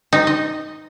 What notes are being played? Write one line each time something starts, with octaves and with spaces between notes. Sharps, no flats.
D#4
D#5